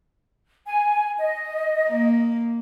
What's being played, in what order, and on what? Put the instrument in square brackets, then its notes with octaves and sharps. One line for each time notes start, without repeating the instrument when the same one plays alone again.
[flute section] G#5
D#5
[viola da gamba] A#3